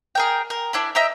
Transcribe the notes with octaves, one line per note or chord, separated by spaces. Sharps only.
G#4 A#4 G5
A#4
D4 E4 B5
D#5 E5 G5 A#5